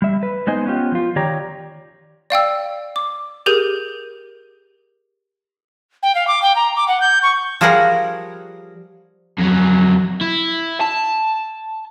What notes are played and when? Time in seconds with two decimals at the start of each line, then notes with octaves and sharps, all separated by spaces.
0.02 G3 E5
0.23 B4
0.47 G#3 B3 D#4 C5 D#5 G#5
0.66 B3 C#4 F4 G4
0.92 F3 F4
1.16 D#3 G4 C#5 D5 G5 A#5
2.30 D5 F5 G5 E6
2.96 D6
3.46 G4 G#4 A#4 G6 D#7
6.02 G5
6.15 F5
6.27 D6
6.42 G5
6.55 A#5
6.75 D6
6.88 F#5
7.00 G6
7.22 C#6
7.61 F3 G3 G#4 A#4 C#5 F#5
9.39 F2 F#3
10.21 E4
10.81 A5